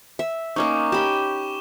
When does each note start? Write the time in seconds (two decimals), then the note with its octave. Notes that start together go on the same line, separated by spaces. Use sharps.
0.19 E5
0.56 A#3 C#4 D#4 C#6 D6
0.92 G4 B5 E7 G7